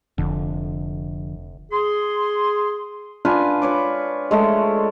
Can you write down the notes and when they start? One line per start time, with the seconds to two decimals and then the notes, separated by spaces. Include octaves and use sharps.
0.18 F1 F2 D3
1.72 G#4 C6
3.25 D4 F4 B4 G#5
3.62 B4 C#5 D6
4.31 G#3 A3 A4